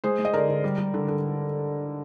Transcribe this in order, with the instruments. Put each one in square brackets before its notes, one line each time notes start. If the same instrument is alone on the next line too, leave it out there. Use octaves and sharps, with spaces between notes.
[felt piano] G#3 G#4 C5
G#3
D#5
D3 A#4 D5
D3
G3
G3
D3
D3